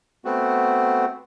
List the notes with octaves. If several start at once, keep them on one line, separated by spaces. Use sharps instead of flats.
A3 B3 C4 F#4